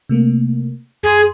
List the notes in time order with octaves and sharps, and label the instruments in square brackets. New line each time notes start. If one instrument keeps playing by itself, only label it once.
[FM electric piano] C3 A3 A#3
[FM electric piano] F#2 C6 [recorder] G#4